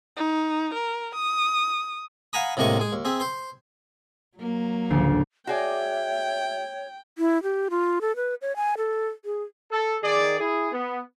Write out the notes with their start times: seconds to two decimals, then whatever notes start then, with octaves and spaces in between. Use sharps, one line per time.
0.17 D#4
0.74 A#4
1.15 D#6
2.33 F5 F#5 G#5 A#5 B5 D#6
2.57 A2 C3 G#3 A#3 D#5 C#6
2.80 G#3 G#4
2.93 D#2
3.05 C4 G#4 E5
3.20 C5 C6
4.38 F#3 A#3
4.90 A1 D2 C#3 F3 C7
5.47 F#4 G#4 C#5 D5 E5 G5
7.18 E4
7.43 G4
7.70 F4
8.01 A4
8.16 B4
8.42 C#5
8.56 G#5
8.78 A4
9.25 G#4
9.71 A4
10.02 D#3 G#4 D5
10.39 E4 G#4
10.72 B3